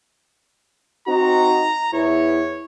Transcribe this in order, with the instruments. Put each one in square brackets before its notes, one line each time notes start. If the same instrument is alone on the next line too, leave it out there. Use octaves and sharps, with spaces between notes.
[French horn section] C4 D#4 F#4 [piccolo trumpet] A#5
[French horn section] E2 E4 [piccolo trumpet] C#5